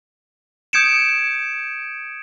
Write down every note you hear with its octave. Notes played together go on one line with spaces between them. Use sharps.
D#6 G6 G#6 C#7 D7 E7